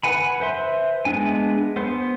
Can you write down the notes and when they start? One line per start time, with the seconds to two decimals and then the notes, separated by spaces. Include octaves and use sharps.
0.03 B4 F#5 G#5 B5
0.40 B4 C5 E5 C6
1.05 G#3 B3 D4 G#5
1.76 B3 C5